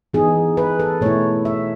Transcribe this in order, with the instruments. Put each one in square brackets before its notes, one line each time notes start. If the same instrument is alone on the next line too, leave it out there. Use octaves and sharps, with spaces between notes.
[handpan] E3 B3 D#4 G#4
B4
A4
B2 A3 E4 C#5
E5